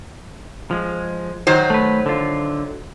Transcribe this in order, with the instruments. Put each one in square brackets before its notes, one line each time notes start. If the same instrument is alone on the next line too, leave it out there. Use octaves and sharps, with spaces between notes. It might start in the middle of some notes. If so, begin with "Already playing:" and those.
[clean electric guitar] F3 G#3
[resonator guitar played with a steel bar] D#3 F#3 C5
[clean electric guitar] A3 B4
D3 F4